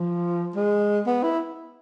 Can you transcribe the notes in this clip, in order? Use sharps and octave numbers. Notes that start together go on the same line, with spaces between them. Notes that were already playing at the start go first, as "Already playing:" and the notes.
Already playing: F3
G#3
B3
E4